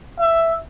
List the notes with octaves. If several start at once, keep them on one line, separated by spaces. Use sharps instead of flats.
E5